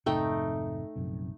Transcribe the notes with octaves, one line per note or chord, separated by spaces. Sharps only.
G#1 F2 C3 A3 D#4 G5
A#1 F#2 C3